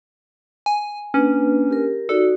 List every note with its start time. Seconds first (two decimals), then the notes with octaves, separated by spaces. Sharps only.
0.66 G#5
1.14 A#3 C#4 D4 B4
1.71 G4 A#4
2.09 D#4 F#4 A4 D5